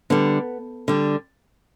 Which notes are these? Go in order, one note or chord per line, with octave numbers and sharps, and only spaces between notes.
D3 G3 B3
D3 G3